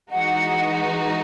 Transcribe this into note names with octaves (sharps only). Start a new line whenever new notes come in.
E3 G#3 D#4 F#4 F#5